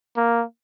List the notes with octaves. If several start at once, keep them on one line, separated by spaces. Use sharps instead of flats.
A#3